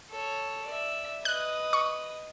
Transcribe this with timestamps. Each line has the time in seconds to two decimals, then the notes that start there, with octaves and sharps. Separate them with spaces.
0.10 A4 C#5
0.67 D5 E5
1.25 B4 D#5 F#6
1.73 C#6